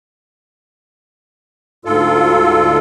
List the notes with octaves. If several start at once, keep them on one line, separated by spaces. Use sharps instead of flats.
D2 G#2 F4 A4